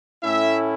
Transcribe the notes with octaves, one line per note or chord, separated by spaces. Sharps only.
A2 A3 C#4 E4 E5